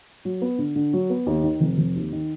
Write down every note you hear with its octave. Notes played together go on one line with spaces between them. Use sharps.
F#3
B3
D3
D3
F#3
B3
D#2
D#3
F1
F1
D#2
D#3